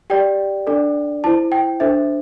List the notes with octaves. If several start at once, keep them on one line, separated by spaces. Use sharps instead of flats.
G4 D5 G5
D4 A4 D5
E4 C5 A5
G5
D4 A4 C5 E5